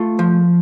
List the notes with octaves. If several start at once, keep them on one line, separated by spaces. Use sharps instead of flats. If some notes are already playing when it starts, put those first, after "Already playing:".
Already playing: A3 F4
F3